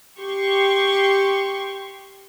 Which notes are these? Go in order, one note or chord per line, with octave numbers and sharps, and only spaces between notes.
G4 C6 C#6